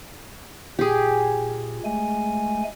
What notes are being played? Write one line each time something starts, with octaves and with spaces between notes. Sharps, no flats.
A#2 G4 G#4
G#3 A3 G#5